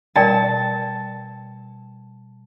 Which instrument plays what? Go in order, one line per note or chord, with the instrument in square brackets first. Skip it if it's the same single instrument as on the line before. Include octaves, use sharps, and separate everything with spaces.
[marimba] B2 G3 [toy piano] A#4 D5 G5 [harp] A5